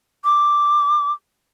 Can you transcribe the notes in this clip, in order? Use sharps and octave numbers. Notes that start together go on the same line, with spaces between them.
D6